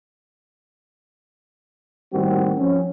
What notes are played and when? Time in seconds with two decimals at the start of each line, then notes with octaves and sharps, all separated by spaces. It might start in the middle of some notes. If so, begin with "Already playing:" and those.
2.13 A2 D#3 G3 A#3 C4 F#4
2.58 F3 C#4